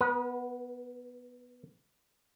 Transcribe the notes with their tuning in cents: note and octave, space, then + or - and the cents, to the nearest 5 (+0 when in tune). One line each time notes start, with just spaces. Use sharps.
B3 +0 B4 -40